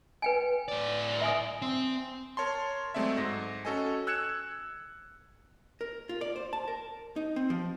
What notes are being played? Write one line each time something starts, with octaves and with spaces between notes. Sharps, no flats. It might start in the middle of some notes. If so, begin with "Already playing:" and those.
B4 G5 G#5
A2 D5
E5 G#5 D#6
C4
A#4 C#5 A5 C6
F#3 G#3 A3 C4 D5 E5
G#2 A#6
C#4 F#4 A4 D#5 G#5
E6 F#6 G#6 C#7 E7
A#4
F4
D5
C5
A5
A#4
D#4
C4
F3